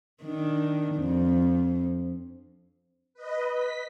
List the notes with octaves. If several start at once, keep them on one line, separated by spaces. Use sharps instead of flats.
D#3 D4
F2
B4 D#5
B6